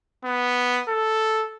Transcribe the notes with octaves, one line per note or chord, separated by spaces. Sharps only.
B3
A4